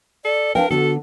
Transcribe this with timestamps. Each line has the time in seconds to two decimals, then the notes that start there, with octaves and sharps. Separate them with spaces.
0.25 A4 D5
0.55 D4 A#4 B4 F5 G5
0.70 D3 B3 F#4 A4